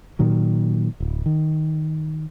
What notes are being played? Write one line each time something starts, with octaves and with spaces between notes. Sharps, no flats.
A#2 D#3 F#3
D1
D#3